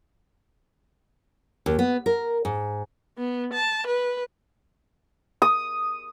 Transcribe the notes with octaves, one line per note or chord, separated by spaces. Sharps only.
D#2
B3
A#4
G#2
B3
A5
B4
D#6